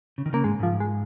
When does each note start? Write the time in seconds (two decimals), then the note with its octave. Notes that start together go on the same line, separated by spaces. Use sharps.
0.18 C#3
0.26 D#3
0.33 C#3 A#3
0.44 G#2 G#3
0.59 G#2 F3
0.80 G#3